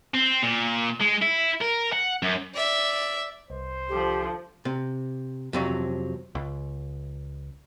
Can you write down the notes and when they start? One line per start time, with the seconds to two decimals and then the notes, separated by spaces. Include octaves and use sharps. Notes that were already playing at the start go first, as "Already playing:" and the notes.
0.14 C4
0.43 A#2
1.01 G#3
1.22 E4
1.61 A#4
1.92 F#5
2.23 F#2
2.54 D5 E5
3.50 C2 C5
3.89 D3 F3 G4
4.65 C3
5.53 F2 C3 F#3
6.35 C#2